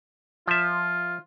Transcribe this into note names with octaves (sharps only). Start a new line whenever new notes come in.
F3 F4 E5